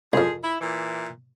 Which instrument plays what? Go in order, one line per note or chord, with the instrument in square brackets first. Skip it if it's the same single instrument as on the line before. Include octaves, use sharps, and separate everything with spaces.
[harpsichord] C2 F2 [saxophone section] F3 G#4
[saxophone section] E4
A#2 E3